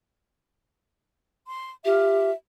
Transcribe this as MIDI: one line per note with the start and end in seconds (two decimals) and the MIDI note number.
1.47 1.71 84
1.85 2.32 65
1.85 2.30 67
1.85 2.32 76